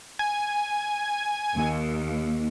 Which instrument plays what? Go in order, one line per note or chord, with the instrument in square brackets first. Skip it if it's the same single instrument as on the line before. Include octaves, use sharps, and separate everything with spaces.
[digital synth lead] G#5
[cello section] D#2